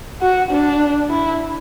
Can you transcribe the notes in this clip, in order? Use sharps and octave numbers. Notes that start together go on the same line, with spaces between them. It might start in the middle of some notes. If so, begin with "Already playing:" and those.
F#4
D4
E4